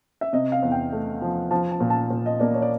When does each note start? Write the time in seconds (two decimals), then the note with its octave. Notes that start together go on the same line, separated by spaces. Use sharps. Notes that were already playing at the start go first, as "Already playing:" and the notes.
0.21 E5
0.33 C3 D#5
0.52 F5
0.62 E2
0.72 G5
0.93 A3
1.22 F3
1.51 F3 A5
1.72 A5
1.80 A#2
1.90 A5
2.10 A#2
2.26 D#5
2.39 A#3 D5
2.54 C#5
2.62 D5